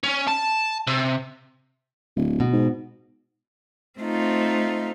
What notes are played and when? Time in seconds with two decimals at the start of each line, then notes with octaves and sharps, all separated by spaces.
0.04 C#4
0.28 A5
0.87 C3
2.16 D1
2.40 B2
2.52 G#2
4.00 A3 C4 D#4 F4